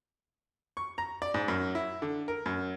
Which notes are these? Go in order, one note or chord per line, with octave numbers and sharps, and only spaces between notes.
C#6
A#5
D5
G#2
F#2
E4
D3
A#4
F#2